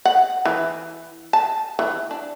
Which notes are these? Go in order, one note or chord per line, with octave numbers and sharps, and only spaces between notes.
F#5
E3
A5
E3
D4